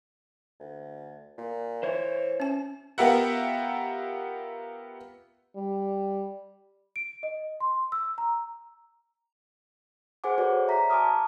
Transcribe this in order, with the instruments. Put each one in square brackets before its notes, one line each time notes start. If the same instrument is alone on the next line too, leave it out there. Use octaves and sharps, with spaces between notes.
[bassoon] D2
A#2
[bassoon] E3 [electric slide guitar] C5 C#5
[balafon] C#4 G#5
[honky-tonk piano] B3 F4 G4 A#4 E5 F#5
[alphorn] G3
[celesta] D7
D#5
C6
E6
A#5
[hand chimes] G#4 C5 F#5 G#5 D6
F#4 G#4 A4 B4 C#5 D5
E5 A#5 B6
G#5 A5 C6 D6 D#6 F6